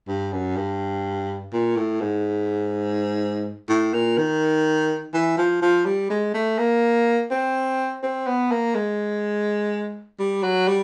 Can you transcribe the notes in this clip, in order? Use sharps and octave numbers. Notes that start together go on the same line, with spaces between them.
G2
F#2
G2
A#2
A2
G#2
A2
A#2
D#3
E3
F3
F3
G3
G#3
A3
A#3
C4
C4
B3
A#3
G#3
G3
F#3
G3